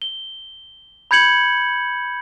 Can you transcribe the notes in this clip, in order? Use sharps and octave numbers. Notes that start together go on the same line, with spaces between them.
G7
B5 G6 G#6 C#7 F#7